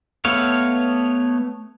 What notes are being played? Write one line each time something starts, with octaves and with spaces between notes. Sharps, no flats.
A3 B3 C#5 F5